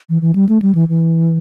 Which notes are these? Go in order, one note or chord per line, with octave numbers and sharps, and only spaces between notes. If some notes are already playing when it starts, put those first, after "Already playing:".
E3
E3
G3
A3
G3
E3
E3